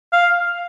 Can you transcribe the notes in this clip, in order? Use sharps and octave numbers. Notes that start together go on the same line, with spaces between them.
F5